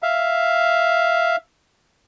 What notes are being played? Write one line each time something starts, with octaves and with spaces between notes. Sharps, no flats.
E5 F5